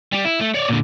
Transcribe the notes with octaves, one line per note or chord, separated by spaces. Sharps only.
G3 G4
E4
A3
C#5 D5
A#2 D3